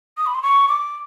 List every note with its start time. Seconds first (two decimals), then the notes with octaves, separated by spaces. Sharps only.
0.17 D#6
0.26 B5
0.34 C6
0.43 C#6
0.68 D6